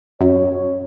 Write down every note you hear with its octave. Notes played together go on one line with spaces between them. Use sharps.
F#2 C#5